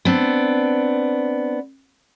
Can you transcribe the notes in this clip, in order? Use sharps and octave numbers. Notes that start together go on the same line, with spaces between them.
B3 C4 D4